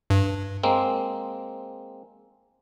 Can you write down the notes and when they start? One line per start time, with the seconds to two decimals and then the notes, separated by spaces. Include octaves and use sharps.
0.10 G2
0.63 G#3 A#3 C4